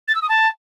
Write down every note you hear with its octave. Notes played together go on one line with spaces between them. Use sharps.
A6
E6
D#6
A5